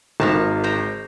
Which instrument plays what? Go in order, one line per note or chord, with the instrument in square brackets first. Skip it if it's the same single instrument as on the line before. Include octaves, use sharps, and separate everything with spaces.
[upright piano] G#1 [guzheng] G#2 A#4 A5
[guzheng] C5 G5 A#5